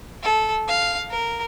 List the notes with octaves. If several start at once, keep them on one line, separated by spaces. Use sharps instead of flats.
A4
F5
A#4